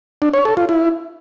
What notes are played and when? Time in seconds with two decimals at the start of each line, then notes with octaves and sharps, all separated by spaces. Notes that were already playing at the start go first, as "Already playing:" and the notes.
0.22 D4
0.33 C#5
0.45 A4
0.57 F4
0.69 E4